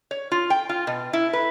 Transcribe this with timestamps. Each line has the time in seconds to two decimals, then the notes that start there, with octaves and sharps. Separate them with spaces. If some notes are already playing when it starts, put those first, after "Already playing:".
0.11 C#5
0.32 F4
0.50 G5
0.69 F4
0.87 B2
1.13 E4
1.33 B4